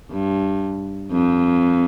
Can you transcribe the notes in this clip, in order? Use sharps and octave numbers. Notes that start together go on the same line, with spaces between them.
G2
F2